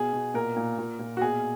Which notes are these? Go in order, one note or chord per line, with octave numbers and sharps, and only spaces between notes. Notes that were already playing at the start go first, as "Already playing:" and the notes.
Already playing: B2 G#4
B2
A#2 A#4
A#2
A#2
A#2
F#4
B2 G#4